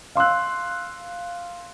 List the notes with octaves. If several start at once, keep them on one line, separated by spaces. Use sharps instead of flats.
F5 C6 E6 F#6